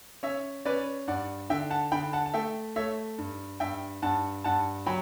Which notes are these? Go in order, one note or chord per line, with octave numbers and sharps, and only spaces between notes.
C#4 C#5 E5
C#4 B4 D5
G2 D5 F#5
D3 E5 G5
F#5 A5
D3 G5 B5
F#5 A5
A5
A3 E5 G5
A3 C#5 E5
G2
G2 E5 G5
G2 F#5 A5
G2 F#5 A5
F#3 G5 B5